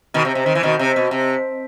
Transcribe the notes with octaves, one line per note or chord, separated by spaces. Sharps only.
B2 D#3
C3
C3
D#3
E3
B2 D#3
C3
B2
C3